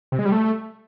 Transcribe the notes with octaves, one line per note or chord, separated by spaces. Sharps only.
C3
G#3
G3
A3